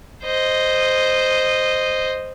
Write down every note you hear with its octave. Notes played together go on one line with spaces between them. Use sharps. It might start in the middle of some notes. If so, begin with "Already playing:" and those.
C5 D#5